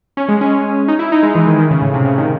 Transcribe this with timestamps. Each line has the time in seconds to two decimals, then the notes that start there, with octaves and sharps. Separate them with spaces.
0.17 C#4
0.29 G#3
0.41 C#4
0.88 D#4
0.99 E4
1.12 D#4
1.23 G#3
1.35 E3
1.47 D#3
1.59 D#3
1.71 C#3
1.82 A2
1.94 C3
2.05 C#3
2.18 D#3